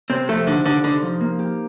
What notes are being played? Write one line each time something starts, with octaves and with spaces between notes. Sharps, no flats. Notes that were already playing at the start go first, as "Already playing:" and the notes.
C3 C4
F3 A3
D3 D#4
D3 D#4
D3 D#4
F3
A#3
G4